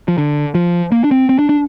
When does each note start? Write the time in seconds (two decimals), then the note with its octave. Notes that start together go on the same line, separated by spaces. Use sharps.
0.08 F3
0.18 D3
0.55 F3
0.92 A#3
1.04 D4
1.11 C4
1.29 C4
1.39 D4
1.49 D4